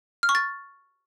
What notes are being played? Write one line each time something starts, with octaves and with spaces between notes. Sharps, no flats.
F6
C#6
A6